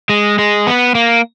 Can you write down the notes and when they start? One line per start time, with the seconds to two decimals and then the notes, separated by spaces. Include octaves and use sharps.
0.09 G#3
0.39 G#3
0.67 B3
0.95 A#3